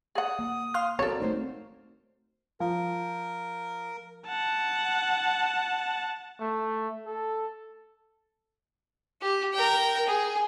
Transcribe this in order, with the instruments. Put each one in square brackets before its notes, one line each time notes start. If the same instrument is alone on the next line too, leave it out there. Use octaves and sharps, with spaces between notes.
[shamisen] G#4 F#5 [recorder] D#6
[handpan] A#3
[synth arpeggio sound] F5 C6 F6
[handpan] C4 F#4 A#4 [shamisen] A4 C#5 [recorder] D5
[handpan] A3 C4 D#4 [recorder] C5
[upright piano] F3 [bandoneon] A#4
[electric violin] F#5 A5
[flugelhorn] A3
A4
[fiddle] G4
A#4 G5
G#4